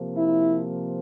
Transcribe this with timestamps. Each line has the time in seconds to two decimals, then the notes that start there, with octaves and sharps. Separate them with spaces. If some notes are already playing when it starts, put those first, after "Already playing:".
Already playing: C3 F3 A#3
0.15 E4